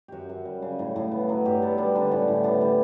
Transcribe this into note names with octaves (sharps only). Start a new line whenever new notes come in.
F#2 F#4 G4
F#2
G3
C#3
A2
A2
B3
F#3
G2 G4
B3 A4
G3 D4
D3 D4
A2 C#4
A2
B3 D4
G3